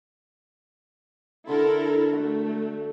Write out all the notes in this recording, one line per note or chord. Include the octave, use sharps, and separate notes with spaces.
D3 E4 A4 A#4 E5 C6
A3 F#4